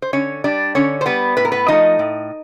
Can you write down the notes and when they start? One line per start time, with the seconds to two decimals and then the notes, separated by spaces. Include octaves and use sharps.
0.02 C5
0.13 D3 C#4 C#5
0.44 G3 D4 D5
0.75 D3 C#4 C#5
1.01 C5
1.06 G3 B3 B4
1.37 A2 B4
1.45 A#4
1.52 B3 B4
1.68 F3 A3 D#4 D#5
1.99 A2